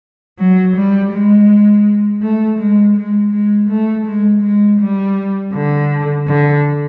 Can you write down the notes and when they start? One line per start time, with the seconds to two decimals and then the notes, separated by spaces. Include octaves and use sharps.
0.39 F#3
0.76 G3
1.12 G#3
2.22 A3
2.59 G#3
2.96 G#3
3.33 G#3
3.70 A3
4.06 G#3
4.43 G#3
4.80 G3
5.53 D3
6.27 D3